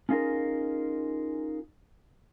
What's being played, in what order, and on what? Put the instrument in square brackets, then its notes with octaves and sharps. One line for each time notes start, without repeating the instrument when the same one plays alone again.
[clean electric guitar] C#4 D#4 F4 G#4 A#4